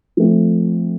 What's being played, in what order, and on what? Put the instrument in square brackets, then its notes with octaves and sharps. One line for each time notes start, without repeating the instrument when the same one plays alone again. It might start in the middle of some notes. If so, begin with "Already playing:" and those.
[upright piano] F3 A3 C4